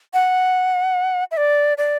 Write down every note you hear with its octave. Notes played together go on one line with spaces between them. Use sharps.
F#5
E5
D5
D5